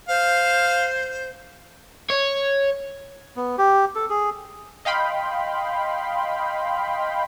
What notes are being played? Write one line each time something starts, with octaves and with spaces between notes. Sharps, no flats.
C5 F5
C#5
B3
G4
A4
G#4
D#5 F5 G5 B5 C6